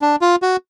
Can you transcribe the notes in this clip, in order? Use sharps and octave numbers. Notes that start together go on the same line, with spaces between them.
D4
F4
F#4